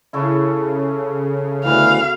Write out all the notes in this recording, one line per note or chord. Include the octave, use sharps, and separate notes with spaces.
C#3 E4 A4 C#6
D2 B2 E3 F5 B5